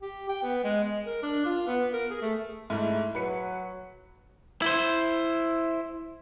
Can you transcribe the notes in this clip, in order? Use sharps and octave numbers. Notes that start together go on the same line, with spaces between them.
G4
G5
B3
G#3
G#3
A#4
D4
F4
B3
A#4
G#4
A3
G#2 A3 E4
F#3 B4 C#7
E4 C5